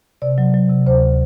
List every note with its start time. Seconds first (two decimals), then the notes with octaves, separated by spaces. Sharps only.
0.22 C3 D5
0.38 F#3
0.54 F#3
0.69 C3
0.86 D2 C5